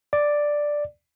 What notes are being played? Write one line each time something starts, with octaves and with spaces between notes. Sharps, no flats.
D5